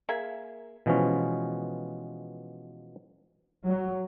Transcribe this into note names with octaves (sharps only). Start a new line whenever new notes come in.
A#3 G#4 E5
B2 E3 F3 G#3 C#4
F#3